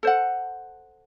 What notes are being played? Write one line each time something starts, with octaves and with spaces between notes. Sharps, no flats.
A4 C5 F#5